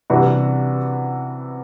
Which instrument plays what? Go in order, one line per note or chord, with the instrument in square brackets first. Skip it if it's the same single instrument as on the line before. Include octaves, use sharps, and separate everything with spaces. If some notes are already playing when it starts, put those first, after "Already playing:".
[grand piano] C3 E3 G3 D4 F#4